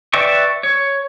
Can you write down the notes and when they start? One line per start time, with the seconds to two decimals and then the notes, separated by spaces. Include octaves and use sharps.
0.13 B4 D5 E5 G5 C#6
0.63 C#5